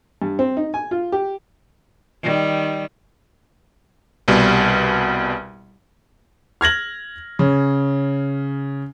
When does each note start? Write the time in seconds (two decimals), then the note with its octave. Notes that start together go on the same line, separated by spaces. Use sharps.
0.22 G2
0.39 C4
0.57 D#4
0.74 G#5
0.91 F4
1.12 G4
2.22 D#3 G3
4.28 C2 B2 G3
6.61 F6 G#6 A#6 F#7
7.39 C#3